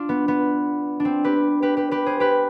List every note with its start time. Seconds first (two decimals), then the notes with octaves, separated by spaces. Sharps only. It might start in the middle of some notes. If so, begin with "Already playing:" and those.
Already playing: D4 F4
0.09 B3
0.28 B3
1.00 D4
1.05 C4
1.24 G4 B4
1.62 G4 B4
1.77 G4 B4
1.91 G4 B4
2.06 G#4 C5
2.20 G4 B4